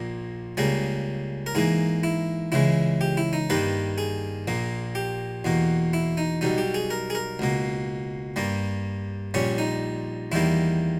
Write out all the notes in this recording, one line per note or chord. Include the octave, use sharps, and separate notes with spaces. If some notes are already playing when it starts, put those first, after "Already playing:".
Already playing: A#1 A#2 A#3
C#2 C#3 G3 A#3 G#4
A#4
G#2 E3 A#3 G#4
E4
C#2 C#3 E3 G#3 E4
G4
E4
D#4
G2 D#3 G3 A#3 B4
G#4
A#1 A#2 A#3
G4
E2 B2 A#3
E4
D#4
B1 B2 G3 D#4
G4
G#4
A#4
G#4
A#4
C#2 B2 A#3
G2 G3 A#3
A#1 A#2 G3 C#4
D#4
E2 D#3 G3 A#3 E4